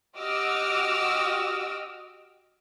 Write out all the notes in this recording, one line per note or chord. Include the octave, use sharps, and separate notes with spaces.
F#4 G4 D#5 D6 E6 F6